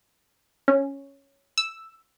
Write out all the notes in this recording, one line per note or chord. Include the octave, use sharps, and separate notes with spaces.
C#4
E6